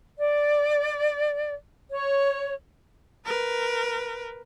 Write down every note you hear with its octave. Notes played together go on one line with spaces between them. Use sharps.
D5
C#5
A#4 B4